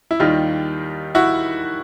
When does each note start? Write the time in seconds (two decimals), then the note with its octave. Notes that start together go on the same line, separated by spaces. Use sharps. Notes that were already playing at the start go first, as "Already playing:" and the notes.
0.11 E4
0.20 D#2 D#3 G3 D#4 F4
1.15 E4 F#4